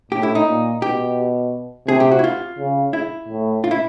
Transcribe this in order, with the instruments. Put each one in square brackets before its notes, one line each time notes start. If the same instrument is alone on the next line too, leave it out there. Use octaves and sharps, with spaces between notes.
[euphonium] A2 [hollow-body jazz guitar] G4
[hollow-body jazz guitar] E4
D#4
[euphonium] A#2
[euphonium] B2 [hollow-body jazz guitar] G4
[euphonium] C3 [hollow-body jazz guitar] G#4
[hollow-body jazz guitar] G4
F#4
E4
F4
[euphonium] C#3
[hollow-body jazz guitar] E4
[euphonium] A2
[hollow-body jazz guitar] F4
E4